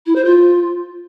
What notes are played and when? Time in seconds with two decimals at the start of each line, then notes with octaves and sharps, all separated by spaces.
0.06 E4
0.16 C5
0.25 F4